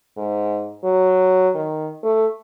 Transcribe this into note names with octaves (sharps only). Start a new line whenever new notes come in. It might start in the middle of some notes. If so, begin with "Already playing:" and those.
G#2
F#3
D#3
A3